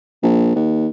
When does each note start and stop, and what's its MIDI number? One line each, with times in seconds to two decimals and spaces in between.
0.23 0.51 34
0.55 0.87 39